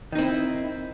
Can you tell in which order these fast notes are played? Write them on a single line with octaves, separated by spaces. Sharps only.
D#3 D#4 C4 E4